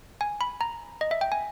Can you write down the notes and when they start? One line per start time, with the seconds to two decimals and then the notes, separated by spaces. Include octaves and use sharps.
0.21 G#5
0.41 B5
0.61 A#5
1.01 D#5
1.11 E5
1.21 G5
1.32 G#5